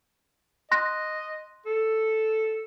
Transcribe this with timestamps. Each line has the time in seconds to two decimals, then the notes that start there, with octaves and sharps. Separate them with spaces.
0.71 D#5 C6 F#6 A#6
1.66 A4